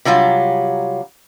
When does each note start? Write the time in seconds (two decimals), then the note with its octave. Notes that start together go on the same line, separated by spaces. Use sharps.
0.05 C3 F#3 G3 F4